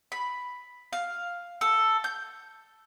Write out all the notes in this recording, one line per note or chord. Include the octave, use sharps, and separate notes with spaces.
B5
F5
A4
G6